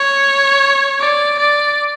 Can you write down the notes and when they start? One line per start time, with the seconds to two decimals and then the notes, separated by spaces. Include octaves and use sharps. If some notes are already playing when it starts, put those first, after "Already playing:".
Already playing: C#5
1.01 D5
1.39 D5